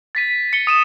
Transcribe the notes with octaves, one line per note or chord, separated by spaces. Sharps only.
A6 B6 D#7
C#7 G7
D#6 D#7 E7